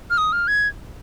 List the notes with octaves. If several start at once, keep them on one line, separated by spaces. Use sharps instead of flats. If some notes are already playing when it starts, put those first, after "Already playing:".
F6
D#6
F6
G#6